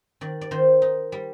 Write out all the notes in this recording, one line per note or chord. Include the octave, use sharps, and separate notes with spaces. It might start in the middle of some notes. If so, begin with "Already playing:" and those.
D#3 D5
D5
D#3 C5
D#4
G3